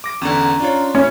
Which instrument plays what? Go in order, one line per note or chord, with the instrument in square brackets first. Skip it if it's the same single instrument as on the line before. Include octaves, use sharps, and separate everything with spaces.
[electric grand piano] D6 A#6 D7
[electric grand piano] E2 D3 [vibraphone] C#4 A#5
[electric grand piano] D4 F4 C#5
[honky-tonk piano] C#4 [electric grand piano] E4